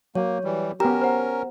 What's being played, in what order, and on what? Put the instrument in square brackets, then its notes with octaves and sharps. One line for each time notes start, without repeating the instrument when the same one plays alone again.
[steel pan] F#3 [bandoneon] A#3 [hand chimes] C#5
[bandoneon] E3 G3
[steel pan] B3 G4 [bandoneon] C#4 A#4 [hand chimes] A#5
[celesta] C5 F#5